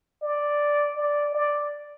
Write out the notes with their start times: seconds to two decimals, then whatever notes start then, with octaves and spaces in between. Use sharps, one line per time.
0.23 D5
0.97 D5
1.34 D5